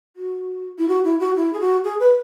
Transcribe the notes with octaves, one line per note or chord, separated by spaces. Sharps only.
F#4
E4
F#4
E4
F#4
E4
G#4
F#4
G#4
B4